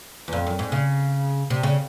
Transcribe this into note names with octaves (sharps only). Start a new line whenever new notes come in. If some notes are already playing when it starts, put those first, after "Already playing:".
E2
F2
F#2
G#2
C#3
C3
C#3